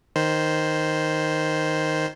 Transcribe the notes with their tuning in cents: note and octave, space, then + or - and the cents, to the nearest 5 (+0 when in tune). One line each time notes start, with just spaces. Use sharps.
D#3 +0 C5 +0